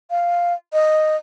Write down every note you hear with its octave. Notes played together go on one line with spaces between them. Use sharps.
F5
D#5